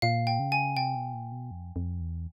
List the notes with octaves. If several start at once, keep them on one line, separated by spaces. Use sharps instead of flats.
A#2 F5
G5
C#3
G#5
C3 G5
B2
A#2
B2
F2
F2
E2